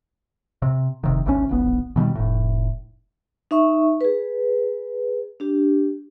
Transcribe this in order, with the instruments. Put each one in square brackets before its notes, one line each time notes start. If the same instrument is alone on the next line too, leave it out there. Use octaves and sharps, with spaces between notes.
[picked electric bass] C3
F1 C3 D#3
G#1 D2 D3 C#4
D1 G#1 B3
B2 D#3 F#3 G3
F1 A2
[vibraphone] D#4 E5 C#6
G#4 B4
D4 G4